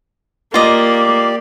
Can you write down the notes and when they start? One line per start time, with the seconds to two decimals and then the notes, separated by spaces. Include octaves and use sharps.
0.54 A#3 F4 G4 D5 D#5